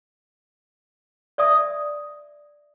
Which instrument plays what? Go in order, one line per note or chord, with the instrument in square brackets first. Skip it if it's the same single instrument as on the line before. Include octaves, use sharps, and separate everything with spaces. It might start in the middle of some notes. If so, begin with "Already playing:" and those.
[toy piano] D5 E5 D#6